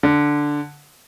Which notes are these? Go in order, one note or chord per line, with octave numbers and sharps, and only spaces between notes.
D3